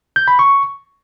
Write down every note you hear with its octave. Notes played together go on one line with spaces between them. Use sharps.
G6
B5
C#6